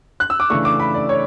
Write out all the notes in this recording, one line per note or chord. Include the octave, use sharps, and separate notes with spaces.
F#6
E6
D6
C#3 E3 A3 D4 C#6
D6
B5
D5
C#5